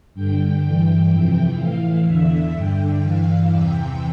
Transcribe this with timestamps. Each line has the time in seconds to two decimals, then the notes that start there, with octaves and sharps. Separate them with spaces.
0.14 G2 D3 G5
0.62 G2 E3 G5
1.10 F2 C3 E3
1.58 A2 E3 F5
2.06 E2 D3 E5
2.53 G2 D3 G5
3.01 G2 E3 F5
3.48 E2 C3 E3 G5